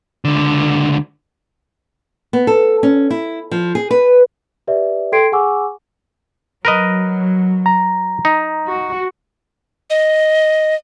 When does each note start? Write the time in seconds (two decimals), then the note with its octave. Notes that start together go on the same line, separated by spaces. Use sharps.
0.25 C#2 D3
2.33 B3
2.47 A4
2.83 C#4
3.10 E4
3.51 F3
3.75 G#4
3.91 B4
4.67 G4 B4 D5 E5
5.12 A4 G5 C6 G#6 C7 D7
5.32 G#4 F#5 G#5 C#6 D6 E6
6.65 F#3 A#4 B4 D#5
7.66 A#5
8.25 D#4
8.68 F#4
9.90 D#5